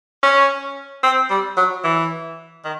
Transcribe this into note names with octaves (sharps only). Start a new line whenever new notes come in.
C#4
C4
G3
F#3
E3
D#3